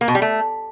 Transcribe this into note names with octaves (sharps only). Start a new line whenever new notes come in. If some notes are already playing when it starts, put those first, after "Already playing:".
A#3
B2
G3
A3